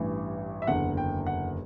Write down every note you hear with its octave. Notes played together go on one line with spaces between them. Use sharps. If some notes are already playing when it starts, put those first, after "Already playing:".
Already playing: A1 G2 E3
E5
F#1 E2 D3 F#5
G5
F#5